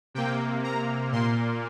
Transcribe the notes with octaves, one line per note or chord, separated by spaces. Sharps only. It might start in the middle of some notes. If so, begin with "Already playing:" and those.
C3 A#3 G5
A#5
A#2 A#3 C6